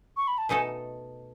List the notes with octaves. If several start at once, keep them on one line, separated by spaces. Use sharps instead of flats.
C#6
B5
A5
B2 A3 D#4 A4 G#5